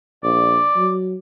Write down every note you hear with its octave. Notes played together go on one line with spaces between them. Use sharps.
A#1 D5
F#3